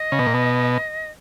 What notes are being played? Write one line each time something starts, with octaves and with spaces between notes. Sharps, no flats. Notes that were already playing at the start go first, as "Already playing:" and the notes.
Already playing: D#5
C#3
B2
A#2
B2